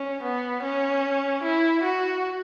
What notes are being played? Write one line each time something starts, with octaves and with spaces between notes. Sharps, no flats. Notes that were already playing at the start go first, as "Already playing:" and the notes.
Already playing: C#4
B3
C#4
E4
F#4